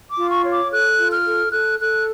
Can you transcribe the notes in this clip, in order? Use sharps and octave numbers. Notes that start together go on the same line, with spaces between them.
D6
F4
C#6
C#5
D6
A4 F#6
F4
F6
A4
A4 F#6
A4 F#6